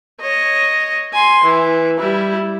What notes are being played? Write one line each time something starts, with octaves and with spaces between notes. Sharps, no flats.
C#5 D#5
G#5 C6
E3
G3 E4